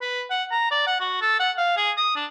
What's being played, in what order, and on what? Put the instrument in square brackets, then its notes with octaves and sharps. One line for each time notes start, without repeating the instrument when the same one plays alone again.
[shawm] B4
F#5
A#5
D5
F#5
F#4
A4
F#5
F5
G#4
D#6
D4